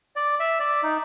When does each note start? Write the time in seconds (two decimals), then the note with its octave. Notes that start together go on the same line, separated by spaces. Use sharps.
0.16 D5
0.40 E5
0.60 D5
0.83 D#4